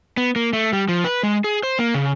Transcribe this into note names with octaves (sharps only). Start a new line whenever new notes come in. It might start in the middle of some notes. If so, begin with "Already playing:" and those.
B3
A#3
A3
G3
F3
B4
G#3
G#4
C5
A#3
C#3